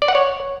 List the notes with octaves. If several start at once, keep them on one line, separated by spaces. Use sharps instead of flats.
D5
F#5
C#5